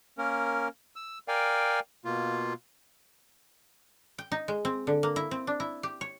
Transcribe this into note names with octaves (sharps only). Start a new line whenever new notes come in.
A#3 C#4 A#4
E6
A#4 D5 F5 G5 G#5
B2 A#3 F4
G5
D#4
G#3
C4
D3
A#3
E4
C4
D4
E4
G4
C#5